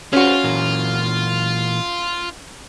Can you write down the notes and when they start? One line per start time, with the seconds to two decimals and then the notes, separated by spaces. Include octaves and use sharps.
0.13 C#4 F4 F#4 G#4 B4 C5
0.44 A#2 E3 A#4